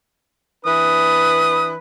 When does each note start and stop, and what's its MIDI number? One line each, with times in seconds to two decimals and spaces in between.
0.65 1.75 52
0.65 1.75 62
0.65 1.75 71
0.65 1.70 87